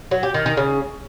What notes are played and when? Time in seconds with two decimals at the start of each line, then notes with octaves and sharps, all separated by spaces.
0.11 F#3
0.23 G4
0.34 D#3
0.46 D#3
0.57 C#3